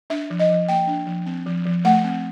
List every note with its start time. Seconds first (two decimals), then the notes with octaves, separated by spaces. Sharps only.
0.10 D4 E5
0.30 F3
0.39 D#5
0.50 F3
0.68 A#3 G5
0.87 D4
1.07 F3
1.26 C4
1.46 F3
1.66 F3
1.85 A3 F#5
2.04 C4